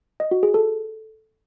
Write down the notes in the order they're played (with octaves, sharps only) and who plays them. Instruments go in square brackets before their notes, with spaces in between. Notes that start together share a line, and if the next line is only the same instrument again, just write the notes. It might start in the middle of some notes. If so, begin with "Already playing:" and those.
[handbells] D#5
F#4
G#4
A4